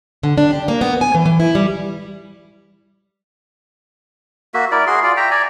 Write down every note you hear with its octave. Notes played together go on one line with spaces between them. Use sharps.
D3
D4
G4
A#3
B3
G#5
E3
E3
E4
G3
A#3 F#4 E5
E4 A#4 D5
F#4 G#4 C6
F4 D5
E5 G5 A#5
D5 G#5 A#5